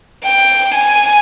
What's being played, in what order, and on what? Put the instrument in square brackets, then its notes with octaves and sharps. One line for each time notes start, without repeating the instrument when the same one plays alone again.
[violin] G5
G#5